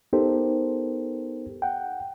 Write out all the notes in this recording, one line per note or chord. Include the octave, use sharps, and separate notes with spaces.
B3 D#4 G4 A4 A#4 C5
F#5 G5